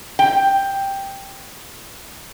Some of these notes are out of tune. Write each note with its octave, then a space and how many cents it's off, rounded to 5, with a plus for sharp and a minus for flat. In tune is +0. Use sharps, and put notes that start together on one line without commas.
G5 +5